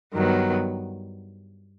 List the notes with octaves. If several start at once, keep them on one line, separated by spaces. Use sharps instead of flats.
G2 D#3 F#3 B3